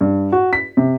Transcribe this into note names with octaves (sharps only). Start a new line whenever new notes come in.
G2
F#4
B6
C3